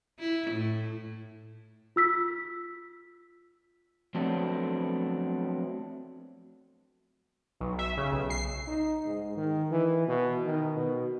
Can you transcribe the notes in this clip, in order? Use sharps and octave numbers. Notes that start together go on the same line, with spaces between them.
E4
A2
F4 E6 B6
F3 F#3 A3 B3 C4 D4
B1
E5
C#3
B1
C7
D#4
G#2
D#3
E3
B2
D#3
B2